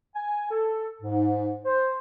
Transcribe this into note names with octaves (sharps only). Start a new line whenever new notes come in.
G#5
A4
G#2
C5